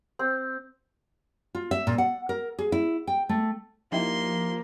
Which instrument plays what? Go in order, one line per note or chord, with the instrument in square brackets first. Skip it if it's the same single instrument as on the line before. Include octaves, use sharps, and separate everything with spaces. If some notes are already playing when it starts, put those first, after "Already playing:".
[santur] C4
[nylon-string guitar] F4
E5
A#2
F#5
A#4
G#4
E4
G5
A3
[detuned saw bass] F3 [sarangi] A#3 [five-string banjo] D#4 E4 G4 [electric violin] C6